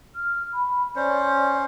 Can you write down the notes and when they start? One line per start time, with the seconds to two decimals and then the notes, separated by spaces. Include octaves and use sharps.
0.15 F6
0.53 B5
0.96 C#4 C5 D5